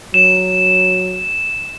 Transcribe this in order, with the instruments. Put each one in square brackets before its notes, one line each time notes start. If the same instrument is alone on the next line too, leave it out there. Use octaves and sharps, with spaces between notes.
[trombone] F#3 [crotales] E7